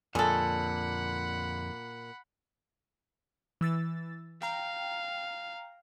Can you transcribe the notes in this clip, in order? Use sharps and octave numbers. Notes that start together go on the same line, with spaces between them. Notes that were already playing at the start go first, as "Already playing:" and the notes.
F2 A#2 D3 G#4 A4 F#5 B5
E3 E6 A6
F5 G5 A#5